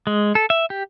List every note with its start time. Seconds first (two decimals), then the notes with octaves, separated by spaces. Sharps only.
0.07 G#3
0.35 A4
0.50 E5
0.70 G4